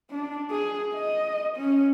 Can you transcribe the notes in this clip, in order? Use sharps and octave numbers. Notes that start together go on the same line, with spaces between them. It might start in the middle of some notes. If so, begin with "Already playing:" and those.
D4
G#4
D#5
C#4